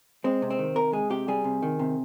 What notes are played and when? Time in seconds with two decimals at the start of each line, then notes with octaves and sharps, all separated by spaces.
0.24 G#3 C4
0.42 C3
0.51 C4
0.59 D#3
0.76 C3 A#4
0.93 G#3 G#4
1.10 C3 G4
1.28 G3 G#4
1.44 C3
1.63 D#3
1.79 C3